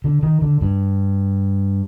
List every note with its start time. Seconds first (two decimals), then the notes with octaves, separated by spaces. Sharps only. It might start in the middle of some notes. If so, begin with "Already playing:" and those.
0.04 D3
0.23 D#3
0.42 D3
0.61 G2